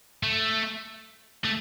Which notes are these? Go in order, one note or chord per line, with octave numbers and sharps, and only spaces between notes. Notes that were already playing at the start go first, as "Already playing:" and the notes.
A3
A3